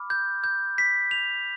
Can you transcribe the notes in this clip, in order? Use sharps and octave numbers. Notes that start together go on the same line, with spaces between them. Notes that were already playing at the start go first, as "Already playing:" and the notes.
Already playing: B5 D6 F6
G6
G6
B6
F7